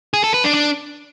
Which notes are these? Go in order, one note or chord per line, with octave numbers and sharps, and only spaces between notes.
G#4
A4
B4
D4
D4